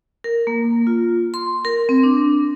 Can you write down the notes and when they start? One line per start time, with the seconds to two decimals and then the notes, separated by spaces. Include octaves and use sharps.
0.24 A#4
0.47 A#3
0.87 F4
1.34 C6
1.65 A#4
1.89 C4
2.03 D4